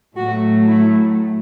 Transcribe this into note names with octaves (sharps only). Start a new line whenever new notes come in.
A2 F#3 A3 F#4
E4